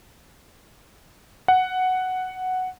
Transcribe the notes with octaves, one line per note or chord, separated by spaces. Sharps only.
F#5